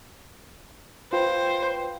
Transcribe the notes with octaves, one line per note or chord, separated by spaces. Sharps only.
F4 B4 C5 G5